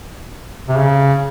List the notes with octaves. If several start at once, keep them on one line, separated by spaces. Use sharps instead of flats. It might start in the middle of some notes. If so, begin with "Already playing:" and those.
C3
C#3